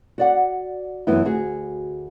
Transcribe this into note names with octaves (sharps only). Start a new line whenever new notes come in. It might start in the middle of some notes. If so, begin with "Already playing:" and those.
F#4 D5 F#5
F#2 E3 B3 E4
D2 F#4 G#4